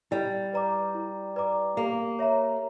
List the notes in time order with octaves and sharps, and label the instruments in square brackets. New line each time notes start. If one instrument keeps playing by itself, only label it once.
[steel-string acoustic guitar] G3 [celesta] E4
[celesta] B4 D5 A#5 D6
E4
B4 D5 A#5 D6
[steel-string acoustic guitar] A#3 [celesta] G4
[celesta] C#5 E5 A#5